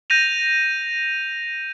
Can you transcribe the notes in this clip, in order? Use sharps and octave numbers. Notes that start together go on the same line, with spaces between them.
G6 A#6 D#7 F7